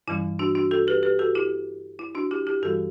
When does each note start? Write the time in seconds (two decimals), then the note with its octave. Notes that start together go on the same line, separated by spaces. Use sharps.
0.08 G2 E3 G3 C#4 E4
0.39 D4 F#4
0.55 D4 F#4
0.71 F#4 A4
0.87 G4 B4
1.03 G4 B4
1.19 F#4 A4
1.35 E4 G4
1.99 E4
2.15 D4 F#4
2.31 E4 G4
2.47 E4 G4
2.62 G2 E3 G3 C#4 F#4 A4